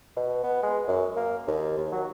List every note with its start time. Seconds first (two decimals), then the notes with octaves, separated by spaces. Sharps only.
0.17 B2
0.44 B3
0.63 G#3
0.88 F#2
1.17 A#3
1.48 D#2
1.78 D#2
1.92 F#3